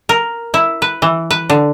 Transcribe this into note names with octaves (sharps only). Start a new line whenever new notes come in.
A#4
E4
B4
E3
B4
D3